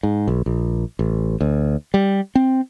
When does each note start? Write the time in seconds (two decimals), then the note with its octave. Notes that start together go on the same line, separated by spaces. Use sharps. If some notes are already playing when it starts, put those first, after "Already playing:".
0.03 G#2
0.28 B1
0.46 A#1
0.99 A1
1.41 D2
1.94 G3
2.35 C4